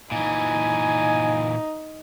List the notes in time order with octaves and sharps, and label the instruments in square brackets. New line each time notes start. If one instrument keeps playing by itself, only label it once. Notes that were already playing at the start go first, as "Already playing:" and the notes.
[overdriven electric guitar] A#2 E3 [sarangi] D#4 [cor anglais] G#5